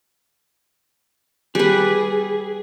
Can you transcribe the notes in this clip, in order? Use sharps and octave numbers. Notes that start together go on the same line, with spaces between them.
G3 G#4 B4